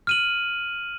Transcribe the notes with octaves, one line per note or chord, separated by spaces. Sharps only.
F6 D#7 F#7